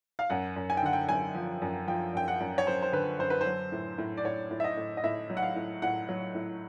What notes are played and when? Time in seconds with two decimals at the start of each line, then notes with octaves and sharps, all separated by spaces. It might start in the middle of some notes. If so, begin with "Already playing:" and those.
0.19 F5
0.30 F#2 F#5
0.56 F#2
0.70 G#5
0.77 G5
0.82 D3 F#5
0.93 G5
1.09 F#2 G#5
1.35 F3
1.62 F#2
1.87 F3 G5
2.14 F#2 G5
2.28 F#5
2.40 F#2
2.58 C#5
2.67 F#2 C5
2.82 C5
2.92 D3 B4
3.19 F#2 C5
3.30 B4
3.41 C5
3.46 F#3
3.72 A2
3.98 A2
4.17 D5
4.25 A2 C#5
4.51 A2
4.60 E5
4.64 D#5
4.77 A2
4.97 D#5
5.04 A2 E5
5.30 F#3
5.37 F#5
5.42 F5
5.56 A2
5.82 A2 F#5
6.09 F#3
6.35 A2